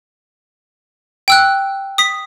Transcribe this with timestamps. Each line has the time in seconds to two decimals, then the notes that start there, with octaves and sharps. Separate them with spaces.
1.28 G5 E6 F#6
1.98 D#6 B6